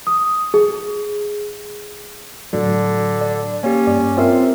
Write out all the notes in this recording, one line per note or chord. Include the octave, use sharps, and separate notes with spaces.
D#6
G#4
A2 D3 F#3
D5
A#3 C#4 G4
G2 D5
C4 F4 A#4 C5 E5